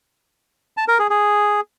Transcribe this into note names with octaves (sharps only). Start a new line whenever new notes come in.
A5
A#4
G#4
G#4